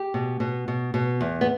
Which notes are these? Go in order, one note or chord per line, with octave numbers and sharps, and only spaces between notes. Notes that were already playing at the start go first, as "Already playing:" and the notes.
Already playing: G4
B2
B2
B2
B2
E2
B3